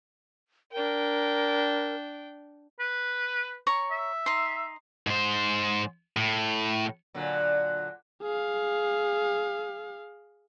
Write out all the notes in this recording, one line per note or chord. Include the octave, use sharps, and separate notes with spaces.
D4 A#4 G5
B4
C#5 A#5 C#6
E5
D#4 C6
G#2 C5
A2
A#2 D3 F#3
G#4 F5